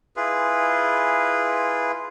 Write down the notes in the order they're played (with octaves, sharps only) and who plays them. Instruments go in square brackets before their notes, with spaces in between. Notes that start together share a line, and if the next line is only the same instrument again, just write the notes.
[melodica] E4 F4 G#4 B4